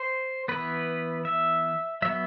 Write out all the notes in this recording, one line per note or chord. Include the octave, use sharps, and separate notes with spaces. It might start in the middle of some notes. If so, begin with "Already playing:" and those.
Already playing: C5
E3 B3 B4
E5
F#3 B3 E5